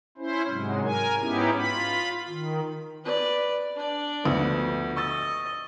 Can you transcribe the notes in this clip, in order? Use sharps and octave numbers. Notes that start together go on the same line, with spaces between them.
C#4 E4 C5
G#2 C3 F#3 G#3
A#4 G#5
G#2 B3 C#4 D#4 E4 G4
F4 B5
D#3
B4 D5
D4 D5
D2 F3 B3
D#5 C#6 E6 A6